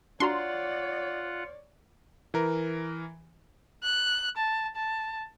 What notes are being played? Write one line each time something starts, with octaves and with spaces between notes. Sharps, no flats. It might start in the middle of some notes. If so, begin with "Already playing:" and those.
D4 F4 F#4 C#5 D5 F#5 A#5 C6
E3 A#4
F#6
A5
A5